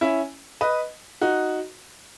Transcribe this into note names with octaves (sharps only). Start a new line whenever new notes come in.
C#4 E4
B4 D#5
D#4 F#4